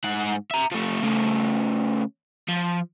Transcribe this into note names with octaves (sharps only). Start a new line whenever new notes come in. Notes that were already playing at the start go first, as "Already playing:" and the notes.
G#2 F#5
E5 A#5
F3 A3
C#3 A3
F3